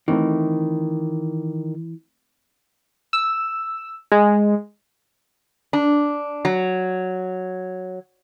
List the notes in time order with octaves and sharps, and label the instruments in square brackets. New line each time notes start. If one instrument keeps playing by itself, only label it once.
[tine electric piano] D#3 [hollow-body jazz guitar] E3 [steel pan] A3 C4 D#4
[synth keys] E6
G#3
[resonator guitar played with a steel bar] D4
F#3